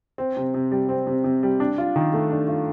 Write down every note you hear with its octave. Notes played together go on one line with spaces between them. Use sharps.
C4
C3
C3
G3
C4
C3
C3
G3
D4
F4
D#3
A3
D4
F4